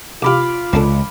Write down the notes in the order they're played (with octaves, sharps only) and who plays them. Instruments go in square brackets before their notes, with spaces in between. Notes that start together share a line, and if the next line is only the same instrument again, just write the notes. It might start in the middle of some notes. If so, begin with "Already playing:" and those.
[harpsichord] C2 G4 [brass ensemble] F4 [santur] F5 B5 D6
[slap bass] C#2 [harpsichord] C4 D4 A4